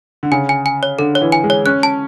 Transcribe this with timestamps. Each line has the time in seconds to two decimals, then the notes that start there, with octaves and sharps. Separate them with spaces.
0.23 D3
0.32 C#3 G#5
0.49 G#5
0.66 G#5
0.83 C#5
0.99 D3 A4
1.15 C#5
1.21 E3
1.32 G#5
1.44 G#3
1.50 C#5
1.66 C#4 F#6
1.83 A5